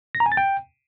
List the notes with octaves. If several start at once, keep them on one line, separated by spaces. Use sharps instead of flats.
A#6
A#5
G#5
A6
G5